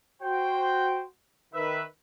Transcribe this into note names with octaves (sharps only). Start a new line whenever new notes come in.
F#4 C5 G5
D#3 B4 E5